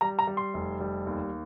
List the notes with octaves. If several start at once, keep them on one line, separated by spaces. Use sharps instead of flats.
G3 A#5
A#5
G3
C6
F1
G3
D#2